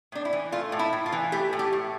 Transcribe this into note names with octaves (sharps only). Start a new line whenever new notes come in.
A2 D4
E4
E3
A3 F4
A2
E4
A2
F4
E3
A3 G4
A2
G4
A2